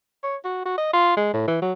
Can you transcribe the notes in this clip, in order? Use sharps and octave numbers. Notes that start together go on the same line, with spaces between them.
C#5
F#4
F#4
D#5
F4
G#3
A2
E3
F#3